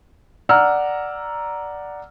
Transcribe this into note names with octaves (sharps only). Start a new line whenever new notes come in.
D5 F#5 A#5 E6 F6